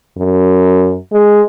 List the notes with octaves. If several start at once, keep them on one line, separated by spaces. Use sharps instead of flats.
F#2
G#3